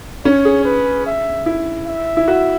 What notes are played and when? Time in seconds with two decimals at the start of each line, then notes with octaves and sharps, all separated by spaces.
0.25 C#4 C#5
0.45 G#4
0.65 B4
1.06 E5
1.46 E4
1.87 E5
2.17 E4
2.28 F#4